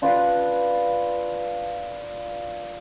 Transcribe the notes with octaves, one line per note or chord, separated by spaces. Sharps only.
D4 F4 B4 D5